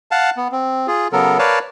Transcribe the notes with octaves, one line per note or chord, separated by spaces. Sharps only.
F5 F#5 A5
B3
C4
F4 G#4
C#3 F#3 B3 A4 A#4
A#4 B4 C#5 D5 F5 A5